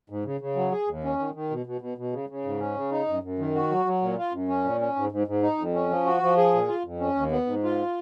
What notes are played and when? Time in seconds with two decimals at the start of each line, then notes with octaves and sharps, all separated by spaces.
0.10 G#2
0.25 C#3
0.41 C#3
0.56 F#3
0.72 G#4
0.88 D#2
1.04 C#4
1.19 D#3
1.35 D#3
1.50 B2
1.66 B2
1.81 B2
1.98 B2
2.13 C#3
2.29 C#3
2.45 G#2
2.60 C#4
2.76 C#3
2.92 D#4
3.08 F#2
3.23 F#2
3.39 D#3
3.55 F#4
3.70 F#3
3.85 F#3
4.02 A#2
4.18 F4
4.33 F#2
4.48 C#4
4.64 A#2
4.81 C#4
4.96 G#2
5.12 G#2
5.27 G#2
5.42 D#4
5.58 F2
5.74 C#4
5.90 F3
6.06 F#4
6.22 F3
6.37 G#4
6.53 A#2
6.68 F4
6.85 F2
7.00 C#4
7.15 D#2
7.32 B3
7.47 G#2
7.63 F4